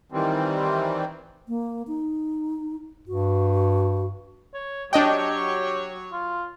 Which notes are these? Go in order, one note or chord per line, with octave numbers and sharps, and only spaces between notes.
D#3 E3 G3 C4
A#3
D#4
G2 F#4
C#5
F#3 D4 G4 C#5 D#5 G5
F4